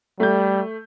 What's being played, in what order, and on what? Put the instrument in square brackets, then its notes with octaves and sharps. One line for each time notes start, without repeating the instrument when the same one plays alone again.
[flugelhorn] G3 [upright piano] A3 G6